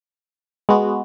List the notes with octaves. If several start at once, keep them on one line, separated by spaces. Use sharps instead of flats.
G#3 B3 F#4